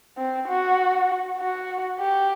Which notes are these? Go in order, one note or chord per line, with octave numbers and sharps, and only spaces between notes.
C4
F#4
F#4
G4